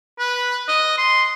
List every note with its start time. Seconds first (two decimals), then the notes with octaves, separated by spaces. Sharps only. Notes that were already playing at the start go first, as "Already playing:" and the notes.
0.19 B4
0.68 D#5
0.98 C6